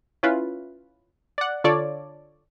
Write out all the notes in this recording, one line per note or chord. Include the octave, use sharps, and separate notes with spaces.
C#4 E4 F4 B4
D5 F#5
D3 F4 A4 C#5 D5